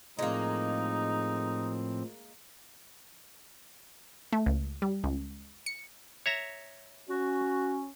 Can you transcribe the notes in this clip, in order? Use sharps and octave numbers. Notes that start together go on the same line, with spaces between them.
A2 F3 G#3 A#3 C4 D#4
A3
C#2
G3
C#2
C#7
C#5 E5 A#5
C#4 F#4